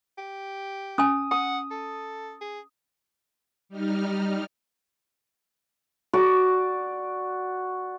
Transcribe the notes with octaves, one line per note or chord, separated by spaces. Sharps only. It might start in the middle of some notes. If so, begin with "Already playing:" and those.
G4
C#4 G#5 D#6
F#5 D#6
A4
G#4
G3 D#4 F6
F#4 D5 D6